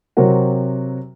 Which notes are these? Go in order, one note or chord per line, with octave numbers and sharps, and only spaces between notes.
C3 F#3 C4 F#4 A#4